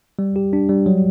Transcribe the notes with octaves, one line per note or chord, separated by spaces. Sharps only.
G3
G4
D4
G3
F#3